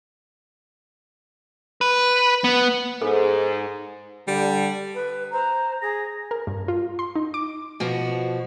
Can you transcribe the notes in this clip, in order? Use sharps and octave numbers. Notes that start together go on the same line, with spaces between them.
B4
B3
G#2 A4
D3 G3
B4
C5 A#5
G#4 A#6
A#4
G2
F4
C6
D#4
D6
B2 F3 F#4